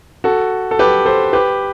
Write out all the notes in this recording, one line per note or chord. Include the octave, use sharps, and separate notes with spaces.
F#4 A4
A4
G4 B4
A4 C5
G4 B4